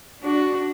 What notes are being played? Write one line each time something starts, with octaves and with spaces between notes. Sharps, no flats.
D4 F#4